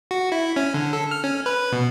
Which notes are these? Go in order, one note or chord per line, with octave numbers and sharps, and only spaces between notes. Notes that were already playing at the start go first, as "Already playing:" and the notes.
F#4
E4
C#4
D3
A4
F6
C#4
B4
B2